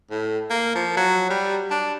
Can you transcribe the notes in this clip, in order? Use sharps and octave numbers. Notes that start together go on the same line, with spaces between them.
A2
A#3
F3
F#3
G3
D4